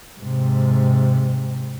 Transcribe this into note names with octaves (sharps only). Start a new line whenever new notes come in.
G#2 C3